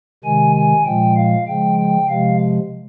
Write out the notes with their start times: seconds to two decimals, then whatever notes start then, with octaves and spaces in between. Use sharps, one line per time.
0.24 C3 D#3 G#3 G#5
0.56 G#5
0.86 A#2 F3 G#3 G5
1.16 F5
1.47 C#3 F3 G#3 G5
1.78 G5
2.09 C3 F3 G#3 F5